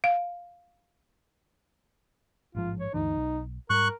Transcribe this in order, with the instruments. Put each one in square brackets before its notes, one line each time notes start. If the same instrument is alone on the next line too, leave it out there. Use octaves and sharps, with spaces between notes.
[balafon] F5
[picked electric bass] A1 G#2 F3 [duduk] F4
[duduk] C#5
[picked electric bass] D2 G2 E3 [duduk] D#4
[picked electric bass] B1
[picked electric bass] G#2 G3 [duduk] A#4 [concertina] C#6 F#6